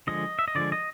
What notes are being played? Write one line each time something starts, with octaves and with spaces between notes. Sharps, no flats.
D3 F3 G#3 D#5
E5
D#5
D3 F3 G#3 D5
D#5